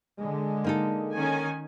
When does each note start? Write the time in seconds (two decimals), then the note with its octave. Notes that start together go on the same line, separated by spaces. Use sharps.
0.19 D3 G#3
0.64 A#3 D#4 A4
1.15 D#3 C#4 G#5